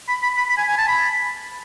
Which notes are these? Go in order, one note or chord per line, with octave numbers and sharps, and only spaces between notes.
B5
B5
B5
B5
G#5
G#5
A5
B5